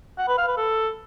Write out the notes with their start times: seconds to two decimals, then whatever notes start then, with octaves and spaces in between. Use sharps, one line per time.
0.18 F#5
0.28 B4
0.38 F5
0.47 B4
0.57 A4